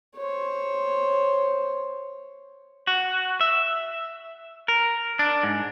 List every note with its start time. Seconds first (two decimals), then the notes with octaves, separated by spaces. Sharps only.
0.16 C5 C#5
2.87 F#4
3.41 E5
4.68 A#4
5.19 D4
5.43 G#2